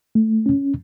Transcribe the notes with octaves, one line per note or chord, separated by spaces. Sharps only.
A3
C#4